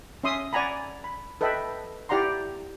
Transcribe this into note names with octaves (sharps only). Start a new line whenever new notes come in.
C#4 E5 C6 D#6
D5 F#5 G#5 A#5 B5
B5
A4 B4 D#5 E5 G5 B5
E4 G4 D5 F#5 A#5 C6